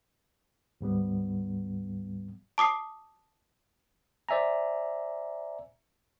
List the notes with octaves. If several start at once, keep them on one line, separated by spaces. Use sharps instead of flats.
D2 G#2 G3 B3
A5 D6 D#6 C7
C5 D5 E5 G#5 A#5